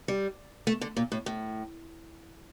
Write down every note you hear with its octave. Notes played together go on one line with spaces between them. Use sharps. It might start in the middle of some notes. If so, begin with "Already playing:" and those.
G3
A3
D3
A#2
A2
A2